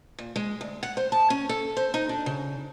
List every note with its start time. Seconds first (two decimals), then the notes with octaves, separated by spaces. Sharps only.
0.19 A#2
0.36 G#3
0.61 D2
0.83 F#5
0.97 C5
1.12 A5
1.30 C#4
1.49 A4
1.77 C5
1.94 D#4
2.09 D4
2.26 C#3